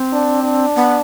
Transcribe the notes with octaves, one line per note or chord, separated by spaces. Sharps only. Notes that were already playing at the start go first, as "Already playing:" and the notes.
Already playing: C4
D4
D4
B3